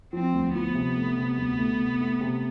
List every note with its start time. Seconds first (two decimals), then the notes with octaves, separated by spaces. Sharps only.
0.13 F3 C4
0.34 D2
0.55 F3 B3
0.75 C3
0.96 A3
1.17 C3
1.38 D2
1.59 A3
1.80 C3
2.01 A3
2.21 C3